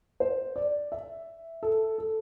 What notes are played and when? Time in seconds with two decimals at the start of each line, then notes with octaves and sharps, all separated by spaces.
0.20 C5
0.56 D5
0.92 E5
1.63 A4
1.98 A4